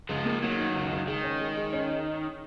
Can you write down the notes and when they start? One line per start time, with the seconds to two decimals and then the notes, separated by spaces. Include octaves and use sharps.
0.09 C#2 F3 G#3
0.25 A#3
0.42 D#3 F#3 A#3
0.58 D#4
0.75 C#2
0.91 C#2
1.07 D#3 G#3
1.24 C#4
1.41 G#3
1.57 G#3
1.73 C#4